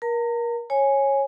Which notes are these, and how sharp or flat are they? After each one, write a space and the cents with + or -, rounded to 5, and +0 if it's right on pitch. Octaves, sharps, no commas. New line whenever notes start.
A#4 +25 A#5 -35
C#5 -15 G#5 +0